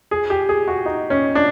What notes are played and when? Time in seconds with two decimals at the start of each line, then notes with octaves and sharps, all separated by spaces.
0.11 G#4
0.30 G4
0.49 G#4
0.68 F#4
0.86 D#4
1.10 C#4
1.35 D4